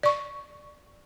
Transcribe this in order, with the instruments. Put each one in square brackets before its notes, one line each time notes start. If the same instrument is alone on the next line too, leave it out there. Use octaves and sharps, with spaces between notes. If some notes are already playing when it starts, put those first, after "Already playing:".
[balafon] D5 C#6